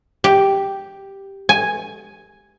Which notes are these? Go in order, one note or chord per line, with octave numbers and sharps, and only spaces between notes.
G4
G#5